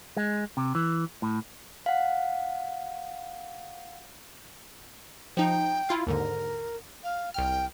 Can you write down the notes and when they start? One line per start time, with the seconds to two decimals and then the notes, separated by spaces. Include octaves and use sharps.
0.17 G#3
0.57 C3
0.75 E3
1.22 A2
1.86 F5 F#5
5.37 F3 D#4 G5
5.89 E4 F4 F5
6.07 D#2 G#2 D3 A#4
7.04 F5
7.34 C2 G5 F6